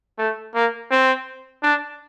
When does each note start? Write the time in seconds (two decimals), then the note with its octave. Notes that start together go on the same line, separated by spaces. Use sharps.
0.18 A3
0.55 A#3
0.91 C4
1.63 D4